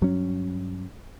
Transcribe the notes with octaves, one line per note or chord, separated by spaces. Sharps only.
G2 F#3 C#4